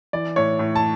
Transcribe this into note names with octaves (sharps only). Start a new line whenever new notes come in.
E3 D5
A2 C#5
A2
A5